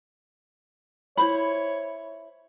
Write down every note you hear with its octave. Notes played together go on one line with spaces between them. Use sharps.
E4 C5 C#5 B5